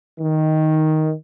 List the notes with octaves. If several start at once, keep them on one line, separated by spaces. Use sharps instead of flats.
D#3